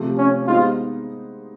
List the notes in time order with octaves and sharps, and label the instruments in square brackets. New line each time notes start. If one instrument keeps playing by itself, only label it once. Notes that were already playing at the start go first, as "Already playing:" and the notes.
Already playing: [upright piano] C3 F3 A3
[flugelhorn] C#4
[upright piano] G#3 B3 D#4 G4 C5 [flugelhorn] F4